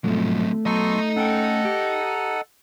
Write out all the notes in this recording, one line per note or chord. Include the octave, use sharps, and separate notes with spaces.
G#2 B2 F3 F#3 A3 C4
F#3 B3 A4 D#5 A#5 C6 C#6
C#4 A4 F#5 G5
G4